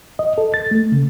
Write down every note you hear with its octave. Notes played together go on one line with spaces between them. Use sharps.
D#5
A4
A6
A3
C#3